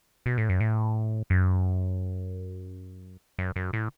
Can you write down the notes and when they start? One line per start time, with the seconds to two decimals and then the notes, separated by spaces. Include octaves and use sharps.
0.26 B2
0.38 A2
0.49 F#2
0.60 A2
1.30 F#2
3.39 F#2
3.56 F#2
3.73 A2